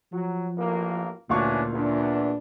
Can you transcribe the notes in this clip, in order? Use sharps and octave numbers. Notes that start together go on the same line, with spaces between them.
F3 F#3
A1 A#3
D2 A#2 E3 C#4 D4 F5 C#6
E2 D4